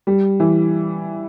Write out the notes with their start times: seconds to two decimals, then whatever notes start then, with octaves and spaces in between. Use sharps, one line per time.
0.07 G3
0.40 E3